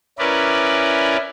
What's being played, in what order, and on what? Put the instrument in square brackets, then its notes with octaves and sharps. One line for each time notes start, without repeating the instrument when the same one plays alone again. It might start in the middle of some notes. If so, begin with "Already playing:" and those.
[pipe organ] C#4 E4 A#4 B4 D5